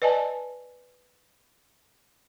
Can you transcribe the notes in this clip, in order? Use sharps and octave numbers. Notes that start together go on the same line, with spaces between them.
B4 D5 D#5 G#5 A5